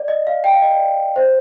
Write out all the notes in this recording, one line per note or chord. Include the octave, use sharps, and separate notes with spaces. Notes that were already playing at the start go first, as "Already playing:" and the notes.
Already playing: D5
D#5
F5
G5
F5
D#5
D5
C5